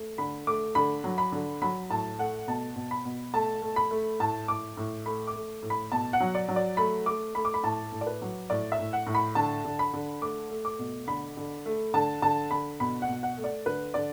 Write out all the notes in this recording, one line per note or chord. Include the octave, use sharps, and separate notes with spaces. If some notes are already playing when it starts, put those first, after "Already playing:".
Already playing: A3
D3 B5
A3 D6
D3 B5
F#3
B5
D3
F#3 B5
A2 A5
A3 F#5
B2 A5
B2
B5
B2
A3 A5
A3
B5
A3
A2 A5
A2 D6
A2
A3 B5
D6
A3
A2
B5
B2 A5
F#5
F#3
D5
F#3
D5
A3 B5
A3 D6
A3 B5
D6
B5
A2 A5
A2
D5
B4
F#3
A2 D5
E5
A2
F#5
A2
B5
D3 A5
D3
B5
D3
A3 D6
A3
D6
B2
D3 B5
D3
A3
D3 A5
D3 A5
D3 B5
B2 B5
F#5
B2
F#5
A3
D5
D3 B4
D3 D5